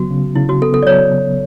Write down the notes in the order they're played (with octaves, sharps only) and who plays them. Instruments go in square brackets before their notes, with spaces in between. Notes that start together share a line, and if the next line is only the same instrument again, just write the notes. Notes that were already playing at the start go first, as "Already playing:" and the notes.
Already playing: [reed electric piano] C#3 F#3 B3 [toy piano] F#4
[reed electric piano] C#3
[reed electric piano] C#3 [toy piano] E4
[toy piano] F#4
[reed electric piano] B3 [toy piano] A4
[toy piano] A4
D5
[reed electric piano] F#3 [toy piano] C#5
[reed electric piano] C#3